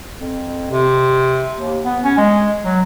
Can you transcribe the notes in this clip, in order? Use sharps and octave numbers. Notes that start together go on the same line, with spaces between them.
F2
C3
D#2
B3
C#4
G#3
F#3